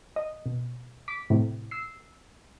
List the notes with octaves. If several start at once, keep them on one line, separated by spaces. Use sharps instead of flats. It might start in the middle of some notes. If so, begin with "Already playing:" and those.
D#5
B2
D6 B6
A2 C3
E6 C7